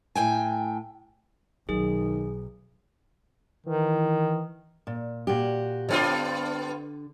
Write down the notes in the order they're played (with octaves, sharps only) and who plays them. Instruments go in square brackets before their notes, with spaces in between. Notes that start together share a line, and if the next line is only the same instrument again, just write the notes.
[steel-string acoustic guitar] A2 G5 G#5
[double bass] B1 [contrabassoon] D#3 [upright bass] F#3 [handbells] G#4
[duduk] D#3 [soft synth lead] E3
[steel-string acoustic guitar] A#2
A#2 F#4 G4
[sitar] G2 B3 F4 [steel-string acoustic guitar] D3